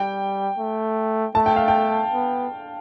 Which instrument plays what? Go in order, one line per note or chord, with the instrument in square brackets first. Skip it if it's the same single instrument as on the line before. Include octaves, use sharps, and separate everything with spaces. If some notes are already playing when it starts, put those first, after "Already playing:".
Already playing: [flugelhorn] G3 [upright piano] G5
[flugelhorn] A3
[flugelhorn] A3 [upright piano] A5
[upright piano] G5
F5
G5
[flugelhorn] B3